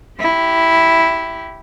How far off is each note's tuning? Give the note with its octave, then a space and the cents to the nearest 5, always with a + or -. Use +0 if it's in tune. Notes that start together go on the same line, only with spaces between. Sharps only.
E4 +0 G4 -20